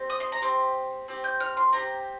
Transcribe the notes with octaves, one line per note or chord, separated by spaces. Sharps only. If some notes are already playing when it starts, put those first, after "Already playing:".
Already playing: C4 G4
D#6
C6
A#5
C4 G4 C6
C4 G4
G6
F6
C6
C4 G4 A#5